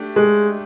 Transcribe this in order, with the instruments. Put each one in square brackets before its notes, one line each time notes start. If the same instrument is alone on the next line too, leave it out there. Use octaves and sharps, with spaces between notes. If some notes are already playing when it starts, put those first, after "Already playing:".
Already playing: [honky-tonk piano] A3 D4 G4
[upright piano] G#3